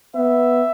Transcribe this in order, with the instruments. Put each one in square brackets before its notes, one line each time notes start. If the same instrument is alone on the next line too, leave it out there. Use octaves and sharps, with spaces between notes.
[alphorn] B3 [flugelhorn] E5